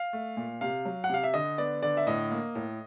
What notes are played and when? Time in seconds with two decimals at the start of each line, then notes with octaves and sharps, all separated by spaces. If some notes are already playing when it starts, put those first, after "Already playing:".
Already playing: F5
0.13 A3
0.37 A#2
0.61 C3 F5
0.85 F#3
1.04 F#5
1.09 C3 F5
1.23 E5
1.34 D3 D#5
1.58 B3 D5
1.82 D3 D5
1.97 E5
2.07 A2 D#5
2.31 A#3
2.55 A2